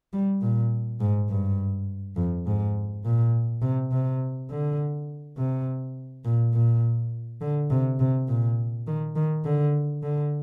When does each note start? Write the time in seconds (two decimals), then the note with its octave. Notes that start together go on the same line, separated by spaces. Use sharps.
0.13 G3
0.42 A#2
1.00 G#2
1.30 G2
2.16 F2
2.46 G#2
3.05 A#2
3.62 C3
3.92 C3
4.50 D3
5.38 C3
6.25 A#2
6.53 A#2
7.41 D3
7.70 C3
8.00 C3
8.28 A#2
8.87 D#3
9.16 D#3
9.45 D3
10.03 D3